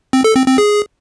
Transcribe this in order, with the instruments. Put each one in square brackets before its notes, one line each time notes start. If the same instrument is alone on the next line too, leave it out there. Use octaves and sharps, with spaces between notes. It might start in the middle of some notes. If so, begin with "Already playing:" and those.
[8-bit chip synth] C4
A4
C4
C4
G#4